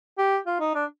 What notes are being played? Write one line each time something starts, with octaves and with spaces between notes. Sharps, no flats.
G4
F4
D#4
D4